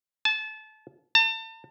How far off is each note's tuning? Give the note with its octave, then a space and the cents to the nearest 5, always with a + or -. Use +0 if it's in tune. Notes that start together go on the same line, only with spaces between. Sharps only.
A5 -25
A5 +40